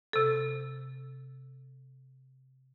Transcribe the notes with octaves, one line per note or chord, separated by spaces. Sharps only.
C3 A4